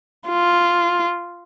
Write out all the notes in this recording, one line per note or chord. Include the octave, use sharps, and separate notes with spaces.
F4